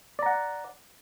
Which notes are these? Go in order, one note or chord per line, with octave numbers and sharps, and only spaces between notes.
D5 F#5 A#5